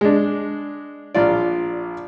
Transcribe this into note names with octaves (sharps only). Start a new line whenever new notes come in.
G#3 D4
A#1 F4 D5